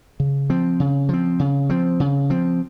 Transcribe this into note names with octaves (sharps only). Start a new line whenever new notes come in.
C#3
F3 C4
C#3
F3 C4
C#3
F3 C4
C#3
F3 C4